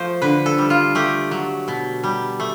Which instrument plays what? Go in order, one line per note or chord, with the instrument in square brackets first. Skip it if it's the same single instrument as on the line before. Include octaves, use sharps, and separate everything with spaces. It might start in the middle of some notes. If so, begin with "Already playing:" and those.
Already playing: [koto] F3 A3 C5
D3 B4
A4
G3
F4
A3 G4
F#3
B2
G3
A3